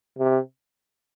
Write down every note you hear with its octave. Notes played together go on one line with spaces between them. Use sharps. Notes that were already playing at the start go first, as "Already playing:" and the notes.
C3